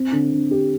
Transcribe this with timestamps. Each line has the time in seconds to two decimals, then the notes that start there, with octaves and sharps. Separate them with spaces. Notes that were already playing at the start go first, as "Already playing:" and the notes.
Already playing: C4
0.12 D3
0.32 D3
0.51 C4 G4